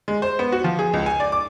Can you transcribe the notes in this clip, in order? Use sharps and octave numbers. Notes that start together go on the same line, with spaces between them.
G#3
C5
B3
F#4
F3
G#4
C#2
G#5
D5
D6